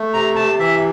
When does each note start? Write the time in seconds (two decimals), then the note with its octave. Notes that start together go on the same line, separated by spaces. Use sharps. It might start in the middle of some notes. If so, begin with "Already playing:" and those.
Already playing: A3
0.14 C3 A#5
0.36 C3 A5
0.59 E3 E5